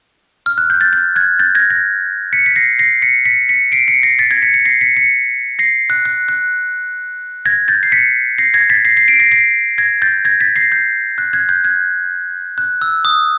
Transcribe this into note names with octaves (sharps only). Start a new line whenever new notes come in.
F6
F#6
G6
G6 A6
G6
F#6 G#6
G6 A6
G#6 A#6
G#6 A#6
B6 C#7
B6
A#6 C7
A#6 C7
B6 C#7
B6 C#7
B6 C#7
C7 D7
B6 C#7
A#6 C7
A6 B6
G#6 A#6
B6 C#7
B6 C#7
A#6 C7
B6 C#7
B6 C#7
A#6 C7
F#6
F#6
F#6
G#6 A#6
G6 A6
C7
B6 C#7
A#6 C7
G#6 A#6
A6 B6
A#6 C7
A#6 C7
C7 D7
A#6 C7
A#6 C7
G#6 A#6
G6 A6
G#6 A#6
A6 B6
A#6 C7
G6
F#6
F#6 G#6
G6
F#6 G#6
F#6
E6
D#6